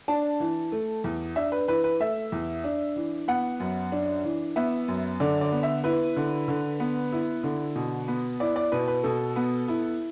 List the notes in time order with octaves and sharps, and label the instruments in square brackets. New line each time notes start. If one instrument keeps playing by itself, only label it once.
[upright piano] D4 A5
E3
A3
E2
D4 E5
B4
E3 B4
B4
A3 E5
E2
D4
E3
B3 F#5
F#2
D4
E3
B3 E5
F#2
D3 D5
D5
B3
E5
E4 B4
D3
D3
B3
E4
D3
B2
B3
E4 D5
D5
B2 B4
B4
B2 A4
B3
E4